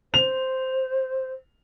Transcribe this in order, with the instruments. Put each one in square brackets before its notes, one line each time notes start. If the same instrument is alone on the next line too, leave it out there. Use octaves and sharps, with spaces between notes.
[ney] C5 [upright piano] F7